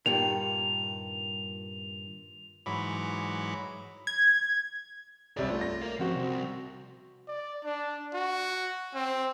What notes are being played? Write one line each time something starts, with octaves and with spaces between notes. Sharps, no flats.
G2 A#2 D#3 F7
G#2 E3 F#3 C#5 B5 D6
G#6
C2 C3 G#4 C#5 D5
A3 F4
A#6
A#4 F5
F3 C4 C#4 F#4
C2
D5
D4
F#4
C4